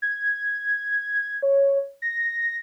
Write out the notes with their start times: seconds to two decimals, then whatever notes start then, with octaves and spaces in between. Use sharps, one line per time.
0.02 G#6
1.42 C#5
2.02 A#6